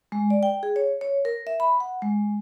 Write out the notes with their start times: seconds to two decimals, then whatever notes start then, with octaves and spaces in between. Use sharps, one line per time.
0.12 G#3
0.30 D5
0.43 G5
0.63 G#4
0.76 C#5
1.01 C#5
1.25 A#4
1.47 E5
1.60 B5
1.80 F#5
2.02 G#3